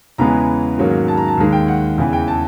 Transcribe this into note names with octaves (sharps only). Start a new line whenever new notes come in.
E2 C#3 E3 G#3 B3 A#5
G#2 D#3 F#3 A#3 C#4
A5
A#5
A5
D#2 D#3 G#3
G5
F#5
E2 C#3 E3
G5
A5